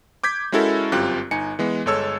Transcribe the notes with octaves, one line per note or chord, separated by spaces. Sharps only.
D6 G6 G#6 B6
G#3 C#4 E4 F#4 A4 A#4
G1 F#2 C4 F4 G4 F#6
G1 D#4 G#5 C#7
E3 G#3 B3
G1 G#3 A4 C#5 A5 E6